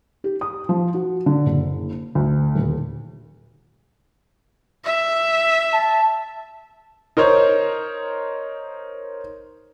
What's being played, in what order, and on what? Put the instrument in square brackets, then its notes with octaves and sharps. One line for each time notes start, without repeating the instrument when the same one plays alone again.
[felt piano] G4
D#6
F3
F#4
D3
F#1
D2
D#1
[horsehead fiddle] E5
[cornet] A5
[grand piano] D#4 A#4 C5 C#5